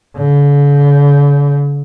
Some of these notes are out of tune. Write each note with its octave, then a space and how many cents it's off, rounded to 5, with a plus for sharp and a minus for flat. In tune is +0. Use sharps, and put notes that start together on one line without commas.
D3 -45